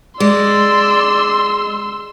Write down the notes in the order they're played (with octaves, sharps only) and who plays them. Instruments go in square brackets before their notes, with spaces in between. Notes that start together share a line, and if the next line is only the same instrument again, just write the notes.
[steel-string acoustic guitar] G#3 [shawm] D5 [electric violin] C6 E6